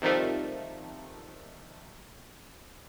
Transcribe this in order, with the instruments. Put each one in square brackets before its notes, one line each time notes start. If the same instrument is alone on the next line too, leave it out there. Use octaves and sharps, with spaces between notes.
[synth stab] C3 D#3 F3 G3 A3